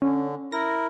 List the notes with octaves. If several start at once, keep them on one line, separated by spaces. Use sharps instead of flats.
D3 C#4
E4 A#4 A#6